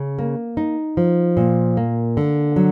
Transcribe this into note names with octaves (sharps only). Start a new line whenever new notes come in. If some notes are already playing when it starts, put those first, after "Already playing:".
Already playing: C#3
A#3
D#4
F3
A#2
A#3
D3
F#3